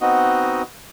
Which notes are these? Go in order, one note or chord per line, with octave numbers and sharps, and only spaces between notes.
B3 C4 D#4 F#4 D#5